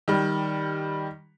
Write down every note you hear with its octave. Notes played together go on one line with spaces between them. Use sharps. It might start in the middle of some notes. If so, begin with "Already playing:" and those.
D#3 G3